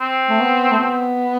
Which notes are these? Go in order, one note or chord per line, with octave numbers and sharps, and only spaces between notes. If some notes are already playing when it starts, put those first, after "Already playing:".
C4
A3
B3
A3
B3